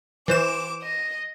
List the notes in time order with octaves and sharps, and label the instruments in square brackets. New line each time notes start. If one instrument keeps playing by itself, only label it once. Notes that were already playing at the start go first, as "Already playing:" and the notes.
[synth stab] E3 C5 E7 [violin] D6
[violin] D#5